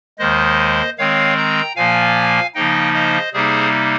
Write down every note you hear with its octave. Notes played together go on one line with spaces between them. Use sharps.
D#2 D#3 G#3 C5 D#5
D#3 G#3 C4 C#5 F5
G5 A#5
A#2 F3 A#3 F5 G#5
C#3 F3 A#3 D#4 D#5 G5
C5 D#5
C3 G3 A#3 D#4 G#4 C5